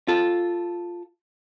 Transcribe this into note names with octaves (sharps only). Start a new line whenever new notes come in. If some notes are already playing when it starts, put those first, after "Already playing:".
F4 A4